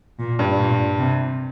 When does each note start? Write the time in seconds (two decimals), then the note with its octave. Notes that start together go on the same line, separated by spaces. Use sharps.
0.19 A#2
0.39 G2
0.59 A#2
0.98 C3